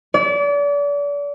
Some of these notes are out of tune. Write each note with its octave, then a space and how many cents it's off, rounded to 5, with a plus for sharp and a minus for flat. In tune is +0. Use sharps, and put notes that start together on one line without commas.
D5 -35